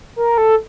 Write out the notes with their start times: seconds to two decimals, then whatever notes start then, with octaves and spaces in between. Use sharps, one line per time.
0.16 A#4
0.38 A4